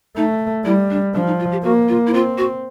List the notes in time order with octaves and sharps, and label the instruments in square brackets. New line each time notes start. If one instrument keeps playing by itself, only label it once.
[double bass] A3 [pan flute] D#4
[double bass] G3 [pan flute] E4
[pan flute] D4
[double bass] F3 [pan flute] D4
[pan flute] D#4
F4
G4
[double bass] A#3 [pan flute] F#4
[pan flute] F4
E4
[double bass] C4 [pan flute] F4
[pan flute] F#4